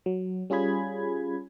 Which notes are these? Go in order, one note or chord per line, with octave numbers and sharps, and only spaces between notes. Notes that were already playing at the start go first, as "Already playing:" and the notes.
F#3
G3 C#4 F4 G#4 B5 G#6